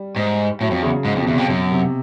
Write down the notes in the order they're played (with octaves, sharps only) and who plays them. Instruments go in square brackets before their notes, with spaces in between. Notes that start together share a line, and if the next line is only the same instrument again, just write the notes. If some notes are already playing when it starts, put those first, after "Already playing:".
Already playing: [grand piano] G3
[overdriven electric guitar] G#2
[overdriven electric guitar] A2 [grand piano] F#3
[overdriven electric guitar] F2
[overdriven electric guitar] E2 [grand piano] C#3
[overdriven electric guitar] G#2
F2
[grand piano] B2
[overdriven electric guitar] E2 [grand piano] C3
[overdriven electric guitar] F2
[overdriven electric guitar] F#2 [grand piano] B2
[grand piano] C3